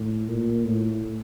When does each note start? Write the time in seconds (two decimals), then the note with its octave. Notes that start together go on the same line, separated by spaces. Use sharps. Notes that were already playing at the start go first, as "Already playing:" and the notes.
Already playing: A2
0.28 A#2
0.65 A2